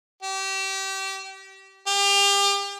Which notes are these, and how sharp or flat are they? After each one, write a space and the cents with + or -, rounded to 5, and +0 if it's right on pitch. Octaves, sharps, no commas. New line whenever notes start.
G4 -25
G4 +35